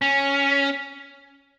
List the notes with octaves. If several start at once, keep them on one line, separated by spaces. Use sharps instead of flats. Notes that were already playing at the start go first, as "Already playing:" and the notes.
C#4